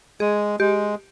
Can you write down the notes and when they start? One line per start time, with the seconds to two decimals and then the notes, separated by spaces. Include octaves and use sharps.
0.20 G#3 G#4
0.60 G#3 G4